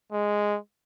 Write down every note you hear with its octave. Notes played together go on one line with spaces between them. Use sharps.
G#3